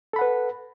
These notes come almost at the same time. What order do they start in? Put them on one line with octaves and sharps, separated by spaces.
A4 B5 F#5 B4